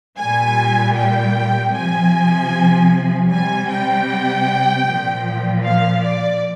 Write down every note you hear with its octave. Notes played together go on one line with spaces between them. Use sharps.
A#2 G3 G#5
G5
C3 F3 G#5
C3 G3 G#5
G5
A#2 F3
F5
D5